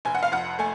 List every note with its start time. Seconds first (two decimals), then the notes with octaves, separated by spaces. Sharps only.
0.05 F1 G#5
0.15 F#5
0.23 F5
0.32 F2 F#5
0.59 A3 G#5